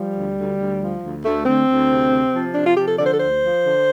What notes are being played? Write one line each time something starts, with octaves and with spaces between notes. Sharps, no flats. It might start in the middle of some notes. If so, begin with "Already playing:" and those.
Already playing: F3 G3
D2
D2
D2
F3
D2
D2 A3
D2 C4
D2
C3
C3
F3
C3 D4
F4
F3 G4
A4
D3 D5
C5
A4
D2 C5
F3
D3